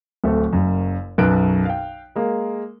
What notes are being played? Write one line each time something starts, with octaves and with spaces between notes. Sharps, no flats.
D1 A3 C4 A4
F#1 F#2
B1 F#2 B2 B4 F#6 D7
F5 G5
G#3 A#3